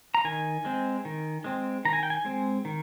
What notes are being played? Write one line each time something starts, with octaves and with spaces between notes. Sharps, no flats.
A#5
D#3 G#5
G#3 C4
D#3
G#3 C4
D#3 A#5
G#5
G5
G#5
G#3 C4
D#3